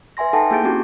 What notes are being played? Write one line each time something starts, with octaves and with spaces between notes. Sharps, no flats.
B4 E5 G#5 C6 A#6
D#4 A4 F#5 G5 A5
A#3 E4 G#4 G6 A6 D7
A#3 C4 C#4 E4 F#4 G4